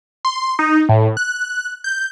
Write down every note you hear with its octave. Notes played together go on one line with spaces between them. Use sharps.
C6
D#4
A2
F#6
G6